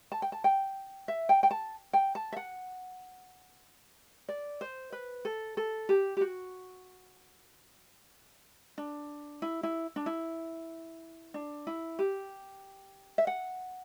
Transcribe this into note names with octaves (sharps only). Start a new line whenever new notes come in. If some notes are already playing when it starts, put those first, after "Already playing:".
A5
G5
A5
G5
E5
G5
G5
A5
G5
A5
E5
F#5
D5
C5
B4
A4
A4
G4
G4
F#4
D4
E4
E4
D4
E4
D4
E4
G4
E5
F#5